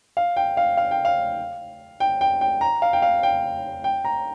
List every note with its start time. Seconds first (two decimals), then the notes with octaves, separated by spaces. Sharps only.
0.17 F5
0.36 G5
0.57 F5
0.77 F5
0.91 G5
1.05 F5
2.00 G5
2.21 G5
2.41 G5
2.61 A#5
2.82 F5
2.93 G5
3.02 F5
3.23 G5
3.84 G5
4.05 A#5